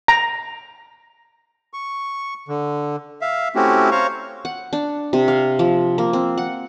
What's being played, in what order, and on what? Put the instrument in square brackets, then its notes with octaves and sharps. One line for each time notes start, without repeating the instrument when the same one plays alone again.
[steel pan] A#5
[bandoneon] C#6
D3
E5 F5
A3 C4 C#4 E4 F#4 G4
C5 C#5 F5 A#5 C#6
[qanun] F#5
D4
C3
F5
F3
A#3
C4
F#5